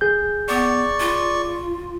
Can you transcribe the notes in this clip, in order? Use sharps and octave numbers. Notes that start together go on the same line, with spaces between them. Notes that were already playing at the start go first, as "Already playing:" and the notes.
G#4 G6
B3 D5 C#6
F4